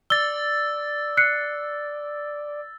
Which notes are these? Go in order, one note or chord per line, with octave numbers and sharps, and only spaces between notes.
D5 E6 A6 G7
F#6 C7 C#7